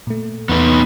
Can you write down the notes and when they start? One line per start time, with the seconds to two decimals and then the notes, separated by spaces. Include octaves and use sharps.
0.07 A#2 A3
0.49 E2 B3 D#4 B4